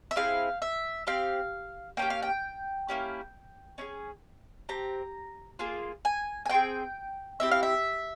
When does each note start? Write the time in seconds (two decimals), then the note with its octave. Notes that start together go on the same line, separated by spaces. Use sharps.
0.11 E5
0.16 C4 E4 G#4 F5
0.62 E5
1.07 C4 G4 F5
1.97 A#3 C#4 G4 G5
2.10 F5
2.22 G5
2.88 A#3 C#4 E4 G4
3.78 C#4 E4 G#4
4.69 C4 G4 A#5
5.59 A#3 F4 G#4
6.05 G#5
6.46 G#5
6.49 C4 F4 G#4 G5
7.40 C4 E4 G4 E5
7.51 F5
7.63 E5